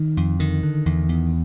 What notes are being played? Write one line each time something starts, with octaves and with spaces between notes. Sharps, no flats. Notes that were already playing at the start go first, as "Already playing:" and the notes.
Already playing: D#3
F2
D3 D#3
D3
E2
E2